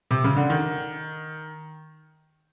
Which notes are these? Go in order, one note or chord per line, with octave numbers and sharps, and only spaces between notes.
C3
C#3
D3
D#3